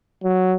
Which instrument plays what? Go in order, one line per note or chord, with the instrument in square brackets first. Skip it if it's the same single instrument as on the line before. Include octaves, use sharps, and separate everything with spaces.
[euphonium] F#3